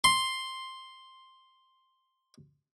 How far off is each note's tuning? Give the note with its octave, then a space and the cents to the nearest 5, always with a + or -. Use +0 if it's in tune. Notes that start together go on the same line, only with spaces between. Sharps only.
C6 +5